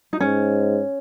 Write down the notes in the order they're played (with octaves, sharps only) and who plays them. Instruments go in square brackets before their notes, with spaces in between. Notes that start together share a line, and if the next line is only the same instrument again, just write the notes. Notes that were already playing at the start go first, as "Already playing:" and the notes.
[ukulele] D#4
[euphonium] G#2 [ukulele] C#4